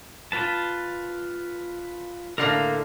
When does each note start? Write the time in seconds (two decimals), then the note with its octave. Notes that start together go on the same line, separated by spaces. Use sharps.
0.32 F4 B4 A5
2.38 A2 D3 A#3 A#4 F5